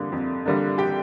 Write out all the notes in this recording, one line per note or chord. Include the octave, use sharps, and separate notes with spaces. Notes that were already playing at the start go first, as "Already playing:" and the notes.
Already playing: F2 D3 G3 A#3 D4
F2
D3 G3 A#3 D4
G4 G5